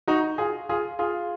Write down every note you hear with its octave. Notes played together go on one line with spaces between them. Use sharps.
D#4 F#4
F4 G#4
F4 G#4
F4 G#4